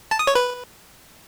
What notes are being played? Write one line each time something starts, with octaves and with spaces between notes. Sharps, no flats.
A5
D#6
C#5
B4